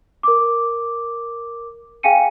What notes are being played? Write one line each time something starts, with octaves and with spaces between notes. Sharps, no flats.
A#4 D6
G#4 F5 G5 G#5 C#7 D#7